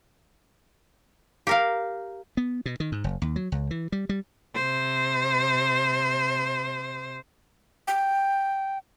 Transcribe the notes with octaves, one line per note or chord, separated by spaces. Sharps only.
G4 A#4 F5
B3
B2
D#3
G#2
F#1
D#2
F#3
C#2
E3
G3
G3
C3 C5
G5